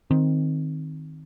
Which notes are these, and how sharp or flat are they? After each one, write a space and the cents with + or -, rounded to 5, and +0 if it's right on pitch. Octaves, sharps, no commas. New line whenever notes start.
D#3 +0 C4 +0